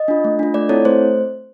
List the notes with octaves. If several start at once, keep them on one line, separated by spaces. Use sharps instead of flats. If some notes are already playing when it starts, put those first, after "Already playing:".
Already playing: D#5
D4 F4
A3
D4 F4
A3 D5
C4 E4 A4 C#5
A3 C5